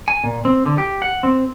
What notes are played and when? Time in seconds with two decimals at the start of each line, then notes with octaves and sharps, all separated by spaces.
0.08 G#5
0.24 A#2
0.45 C4
0.66 D3
0.78 G4
1.02 F#5
1.23 C4